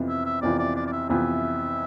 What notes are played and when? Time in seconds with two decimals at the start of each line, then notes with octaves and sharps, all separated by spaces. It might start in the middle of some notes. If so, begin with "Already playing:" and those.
Already playing: F2 C3 E3 B3 F4
0.09 E5
0.25 E5
0.42 F2 C3 E3 B3 F4 D5
0.59 D5
0.76 D5
0.87 D5
0.92 E5
1.09 F2 C3 E3 B3 F4 E5